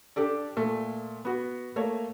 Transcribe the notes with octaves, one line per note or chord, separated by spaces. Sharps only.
D4 G4 A4 D5
A#2 A3
B3 F#4
A3 A#3 C#5